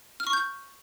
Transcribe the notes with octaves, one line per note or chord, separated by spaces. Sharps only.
F6
C#6
G6